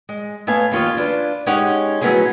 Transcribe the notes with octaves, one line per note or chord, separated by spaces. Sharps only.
G#3
A3 B3 C#5 F5 G#5
D#2 C#4 F4 C#5 D#5
D4 F4 B4
G#3 C#4 D#4 G4 C#5 F#5
F#3 A3 B3 C#4 E4 G#4